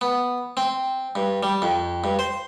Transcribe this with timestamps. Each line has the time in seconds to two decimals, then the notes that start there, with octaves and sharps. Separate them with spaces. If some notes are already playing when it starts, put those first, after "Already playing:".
0.01 B3
0.57 C4
1.15 G2
1.43 G3
1.62 F2
2.04 G2
2.19 C5